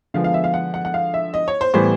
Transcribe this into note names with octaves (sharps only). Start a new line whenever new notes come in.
D3 F3 G#3 B3 F5
F5
E5
F5
F#5
F#5
F#5
F5
E5
D#5
C#5
C5
A2 E3 G3 B3 C5